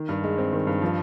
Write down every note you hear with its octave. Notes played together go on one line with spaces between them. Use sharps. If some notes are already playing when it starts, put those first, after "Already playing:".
Already playing: D#3
G2
G#3
C4
D#3
G2
F3